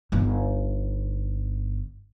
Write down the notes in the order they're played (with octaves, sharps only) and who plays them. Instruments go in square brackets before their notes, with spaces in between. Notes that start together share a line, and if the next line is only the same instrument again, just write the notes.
[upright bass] G1 D#4